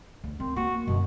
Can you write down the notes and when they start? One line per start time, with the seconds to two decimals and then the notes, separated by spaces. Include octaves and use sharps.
0.24 D2
0.40 D#3 C4
0.56 A#3 F#4
0.88 F#2 B2 D3